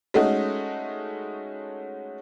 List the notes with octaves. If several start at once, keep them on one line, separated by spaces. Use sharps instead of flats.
G#3 A3 C#4 D#4 F#4